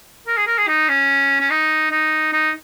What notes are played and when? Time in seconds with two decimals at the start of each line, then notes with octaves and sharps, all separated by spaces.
0.27 A#4
0.37 G#4
0.47 A#4
0.58 G#4
0.68 D#4
0.88 C#4
1.40 C#4
1.50 D#4
1.91 D#4
2.33 D#4